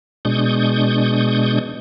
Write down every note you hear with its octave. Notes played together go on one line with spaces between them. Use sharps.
B2 G#3 D4 C#6 D#6 G6